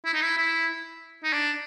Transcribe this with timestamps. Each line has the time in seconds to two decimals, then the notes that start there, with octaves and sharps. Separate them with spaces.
0.05 E4
0.14 D#4
0.22 E4
0.37 E4
1.24 D#4
1.33 D4